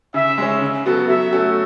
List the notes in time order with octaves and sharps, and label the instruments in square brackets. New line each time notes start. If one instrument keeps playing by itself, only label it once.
[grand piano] C#3 [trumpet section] E5
[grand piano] G#3 C#4
C#3
F#3 B3 F#4 A4
[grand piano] F#3 [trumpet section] E5
[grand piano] A3 C#4 F#4 A4